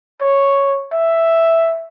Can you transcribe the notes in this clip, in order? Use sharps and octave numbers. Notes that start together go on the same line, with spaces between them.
C#5
E5